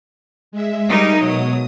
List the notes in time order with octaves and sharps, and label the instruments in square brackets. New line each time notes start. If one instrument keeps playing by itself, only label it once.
[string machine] G#3 E5
[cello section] G3 G#3 D#4 [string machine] A#4
[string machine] B2 D#6 [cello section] F#3